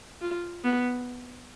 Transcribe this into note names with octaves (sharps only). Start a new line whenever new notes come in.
F4
B3